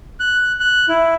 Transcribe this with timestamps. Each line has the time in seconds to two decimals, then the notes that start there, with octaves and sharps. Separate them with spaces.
0.20 F#6
0.60 F#6
0.89 E4